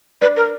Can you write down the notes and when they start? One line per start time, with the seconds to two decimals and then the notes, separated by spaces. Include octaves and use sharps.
0.21 D4 B4 D5
0.36 A#4